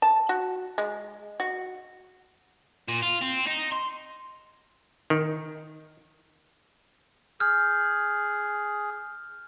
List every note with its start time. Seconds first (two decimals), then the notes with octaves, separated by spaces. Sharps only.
0.02 A5
0.29 F#4
0.78 G#3
1.40 F#4
2.88 A#2
3.02 F4
3.21 C4
3.46 D#4
3.72 C6
5.10 D#3
7.40 G#4 F6 G6